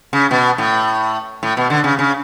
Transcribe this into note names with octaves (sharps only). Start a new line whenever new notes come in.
C#3
B2
A2
A2
B2
D3
C#3
C#3